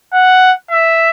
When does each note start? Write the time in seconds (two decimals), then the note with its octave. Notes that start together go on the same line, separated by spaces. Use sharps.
0.13 F#5
0.70 E5